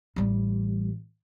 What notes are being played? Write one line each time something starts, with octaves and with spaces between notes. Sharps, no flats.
A1 G3